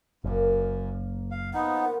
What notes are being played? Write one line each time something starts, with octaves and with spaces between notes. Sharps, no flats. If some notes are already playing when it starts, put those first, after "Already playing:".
F#1 F#2 A#3 A#4
F5
F3 B3 D#4 F#5
G#2 D#3 F4